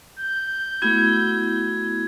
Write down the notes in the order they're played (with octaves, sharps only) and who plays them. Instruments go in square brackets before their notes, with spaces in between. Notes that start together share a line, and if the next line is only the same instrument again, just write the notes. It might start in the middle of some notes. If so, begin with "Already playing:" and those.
[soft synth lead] G6
[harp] A3 F#4 [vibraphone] B3 E4 [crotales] G#6